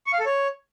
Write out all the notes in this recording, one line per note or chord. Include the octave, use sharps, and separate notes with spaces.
C#6
F5
A4
C#5